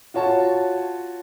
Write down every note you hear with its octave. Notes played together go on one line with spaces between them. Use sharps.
F4 F#4 C#5 A5